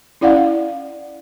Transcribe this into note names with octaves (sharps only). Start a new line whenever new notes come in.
C#4 E4 D5 F5 F#5